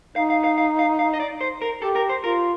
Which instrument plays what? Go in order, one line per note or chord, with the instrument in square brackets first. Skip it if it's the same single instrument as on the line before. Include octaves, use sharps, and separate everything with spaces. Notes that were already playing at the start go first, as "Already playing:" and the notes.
[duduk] D#4 [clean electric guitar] F5
[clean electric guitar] F5
F5
F5
F5
F5
D#5
D5
C5
A#4
[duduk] G4 [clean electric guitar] A4
[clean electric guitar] A#4
C5
[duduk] F4 [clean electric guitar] A#4